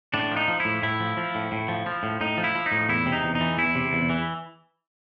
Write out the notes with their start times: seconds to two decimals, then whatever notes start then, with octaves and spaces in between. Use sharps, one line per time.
0.14 A2 D4
0.31 F3
0.37 D#4
0.48 F3
0.60 E4
0.65 A2
0.82 A2 E4
1.00 F3
1.17 F3
1.35 A2
1.52 A2
1.68 F3
1.86 F3
2.03 A2
2.21 A2 D#4
2.38 F3
2.44 E4
2.55 F3
2.66 D#4
2.72 A2
2.89 E2 E4
3.06 C3
3.12 D#4
3.24 E2
3.35 D#4
3.41 E3
3.58 E2 E4
3.75 C3
3.93 E2
4.10 E3